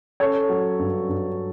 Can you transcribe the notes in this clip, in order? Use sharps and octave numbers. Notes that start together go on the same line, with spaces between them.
C#4 A4 C#5
F#3
G2
G2